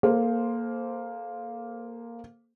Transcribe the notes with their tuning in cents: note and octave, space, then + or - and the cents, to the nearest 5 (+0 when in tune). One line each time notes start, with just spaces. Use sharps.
A#3 +0 A4 -30 C5 +0